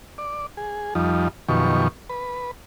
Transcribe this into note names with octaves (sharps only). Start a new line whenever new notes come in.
D5
G#4
F2 F3 G3 D#4
F#2 B2 D#3 F3 G4 C#6
B4